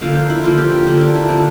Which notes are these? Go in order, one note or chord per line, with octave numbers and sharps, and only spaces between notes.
D3 F3 A#3 F5
C5
E4
D3 F3 A#3 F4
G4
G4
D3 F3 A#3
D4
E4
D3 F3 A#3 C4